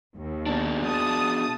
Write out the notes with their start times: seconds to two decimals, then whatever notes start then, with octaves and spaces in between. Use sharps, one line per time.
0.15 D#2
0.46 B2 D4
0.85 A5 D#6